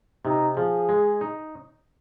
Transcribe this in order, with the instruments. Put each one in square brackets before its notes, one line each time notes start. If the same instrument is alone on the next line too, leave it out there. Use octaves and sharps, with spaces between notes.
[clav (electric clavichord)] C3 [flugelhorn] D#4
[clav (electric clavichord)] F3 [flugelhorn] G#4
[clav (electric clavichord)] G#3
D#4